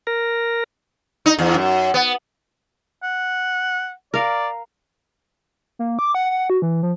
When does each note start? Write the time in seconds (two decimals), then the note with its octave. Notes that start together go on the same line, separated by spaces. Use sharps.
0.07 A#4
1.26 D#4
1.39 E2
1.54 F#2
1.94 B3
3.03 F#5
4.14 A#4 D5 F5
5.79 A#3
5.99 D6
6.15 F#5
6.30 F#5
6.50 F#4
6.62 E3
6.83 F3